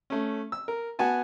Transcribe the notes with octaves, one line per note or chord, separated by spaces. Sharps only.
A3 C#4
E6
A#4
B3 F#4 G#5 A5